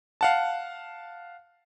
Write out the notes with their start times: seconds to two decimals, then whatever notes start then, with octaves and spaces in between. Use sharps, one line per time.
0.21 F5 F#5 A5